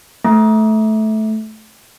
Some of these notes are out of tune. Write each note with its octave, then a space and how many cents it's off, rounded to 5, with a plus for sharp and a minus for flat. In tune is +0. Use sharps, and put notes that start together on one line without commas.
A3 -15 D6 +0